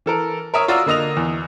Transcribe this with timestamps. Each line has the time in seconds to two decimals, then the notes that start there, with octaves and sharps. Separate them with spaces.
0.06 E3 A4 A#4
0.54 A#4 C#5 E5 C#6 D#6
0.68 F4 F#4 D5 A#5 E6
0.86 D3 A#3 D#5 D#6 F7
1.17 E2